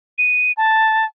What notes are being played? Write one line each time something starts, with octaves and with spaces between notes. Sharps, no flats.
D#7
A5